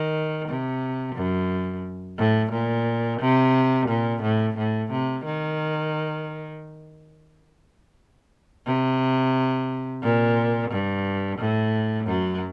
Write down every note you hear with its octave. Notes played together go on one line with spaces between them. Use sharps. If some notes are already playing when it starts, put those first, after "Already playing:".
Already playing: D#3
C3
F#2
A2
A#2
C3
A#2
A2
A2
C3
D#3
C3
A#2
G2
A2
F#2 F#3